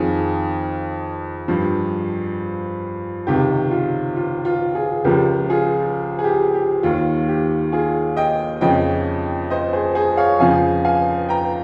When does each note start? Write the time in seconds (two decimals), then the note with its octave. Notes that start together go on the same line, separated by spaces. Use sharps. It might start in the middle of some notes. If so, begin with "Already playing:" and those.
Already playing: F2 D#3 F4 G#4
1.48 G2 F3
3.27 C#2 C3 D#3 G4
3.71 F4
4.16 F4
4.45 F4
4.75 F4 G#4
5.04 C#2 C#3 F3 G4 A#4
5.50 F4 G#4
6.19 G#4
6.24 G4
6.54 G4
6.83 D#2 D#3 F4
7.29 G4
7.72 F4 G#4
8.17 D#5 G5
8.61 F2 C#3 F3 D#5 G5
9.50 C5 D#5
9.73 G#4 C5
9.95 G#4 C5
10.17 C#5 F5
10.40 F2 C#3 F3 F5 G#5
10.85 F5 G#5
11.29 G5 A#5